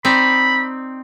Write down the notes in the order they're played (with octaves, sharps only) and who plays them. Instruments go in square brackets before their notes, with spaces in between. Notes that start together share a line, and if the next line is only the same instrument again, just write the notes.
[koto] C4 D#4 D5 [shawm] B5